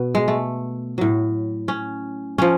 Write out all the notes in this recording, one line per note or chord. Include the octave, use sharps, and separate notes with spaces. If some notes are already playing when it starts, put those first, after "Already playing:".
Already playing: B2 B3
G#3
A3
A2 F#3
C#4
F3 C#4